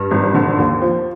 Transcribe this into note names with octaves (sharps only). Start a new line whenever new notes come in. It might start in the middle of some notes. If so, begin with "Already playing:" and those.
Already playing: G2
G#1
D3
D#2
F3